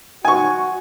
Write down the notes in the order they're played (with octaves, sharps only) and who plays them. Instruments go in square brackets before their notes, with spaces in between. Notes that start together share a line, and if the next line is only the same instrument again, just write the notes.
[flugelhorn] F#4 [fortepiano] G#5 C#6